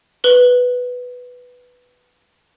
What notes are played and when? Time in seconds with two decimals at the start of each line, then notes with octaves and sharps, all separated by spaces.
0.24 B4 F#7 G7